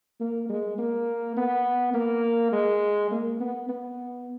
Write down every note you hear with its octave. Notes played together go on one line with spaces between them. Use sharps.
A#3
G#3
A#3
B3
A#3
G#3
A#3
B3
B3